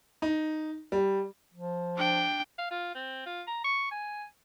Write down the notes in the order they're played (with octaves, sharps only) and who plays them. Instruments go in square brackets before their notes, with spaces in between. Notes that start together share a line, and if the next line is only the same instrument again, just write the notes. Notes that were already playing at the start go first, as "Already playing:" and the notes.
[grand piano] D#4
G3
[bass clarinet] F3
[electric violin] D4 G5
[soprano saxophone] F5
F4
C4
F4
A#5
C#6
G#5